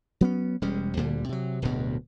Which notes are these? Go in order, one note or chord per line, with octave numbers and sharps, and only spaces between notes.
F#3 B3 C#4
E1 G3 G#3 C#4
D2 A#2 D3 G3
C3 F#3
D1 D2 G2 B2